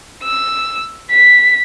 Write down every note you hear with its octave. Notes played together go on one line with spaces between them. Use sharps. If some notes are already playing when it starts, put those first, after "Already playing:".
E6
B6